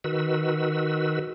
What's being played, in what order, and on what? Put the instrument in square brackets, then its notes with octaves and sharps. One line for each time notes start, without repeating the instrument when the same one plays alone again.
[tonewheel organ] D#3 F#4 B4 E6